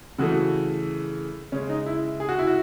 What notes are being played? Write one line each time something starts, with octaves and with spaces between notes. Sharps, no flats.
C#3 E3 A3 F#4
C#3 G#3 C#4
D#4
E4
G#4
F#4
E4
F#4